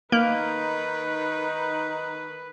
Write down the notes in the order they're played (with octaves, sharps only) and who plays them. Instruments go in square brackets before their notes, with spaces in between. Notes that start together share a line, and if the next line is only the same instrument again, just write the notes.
[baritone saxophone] D#3 [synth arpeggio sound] A#3 [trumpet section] D#4 [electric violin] B4